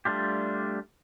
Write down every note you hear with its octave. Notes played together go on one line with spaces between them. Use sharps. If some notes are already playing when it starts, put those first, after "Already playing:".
G3 A3 D4 F4 G4